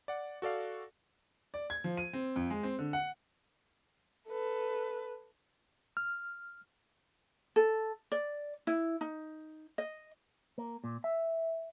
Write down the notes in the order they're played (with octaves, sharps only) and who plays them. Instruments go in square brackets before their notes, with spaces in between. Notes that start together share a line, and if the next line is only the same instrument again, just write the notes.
[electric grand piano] D5 F#5
F#4 A4 D5 F5
[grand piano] D5
G#6
F3
D#7
C4
F2
G#3
C4
D3
F#5
[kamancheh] A4 B4
[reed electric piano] F6
[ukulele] A4
D5
E4
D#4
D#5
[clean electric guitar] A#3
A#2
E5